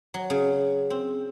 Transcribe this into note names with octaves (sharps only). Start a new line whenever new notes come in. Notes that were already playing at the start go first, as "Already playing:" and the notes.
F#3
C#3
C4